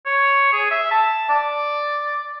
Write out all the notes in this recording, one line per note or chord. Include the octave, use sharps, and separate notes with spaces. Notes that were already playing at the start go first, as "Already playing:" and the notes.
C#5
G#4
E5
A5
D5